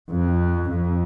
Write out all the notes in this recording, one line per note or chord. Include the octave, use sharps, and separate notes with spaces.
F2
F2